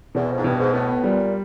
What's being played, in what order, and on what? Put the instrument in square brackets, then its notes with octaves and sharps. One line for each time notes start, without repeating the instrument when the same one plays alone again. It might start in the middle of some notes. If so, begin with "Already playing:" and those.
[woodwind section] E2 [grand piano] B2
[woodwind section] F2
G#2
[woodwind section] G2 [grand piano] B2
[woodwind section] G#2
[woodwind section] A2 [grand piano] B3
[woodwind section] A#2 [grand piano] G3